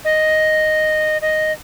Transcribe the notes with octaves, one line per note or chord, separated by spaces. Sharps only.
D#5
D#5